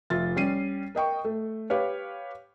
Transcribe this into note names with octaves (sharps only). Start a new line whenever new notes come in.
F1 F4 E5 A6
G3 C#4 C7 D#7
A#4 D#5 G5 C#6
A3
G4 B4 C#5 F5